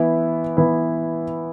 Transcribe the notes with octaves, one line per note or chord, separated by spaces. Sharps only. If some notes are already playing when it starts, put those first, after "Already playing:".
Already playing: E3 B3 E4
E3 B3 E4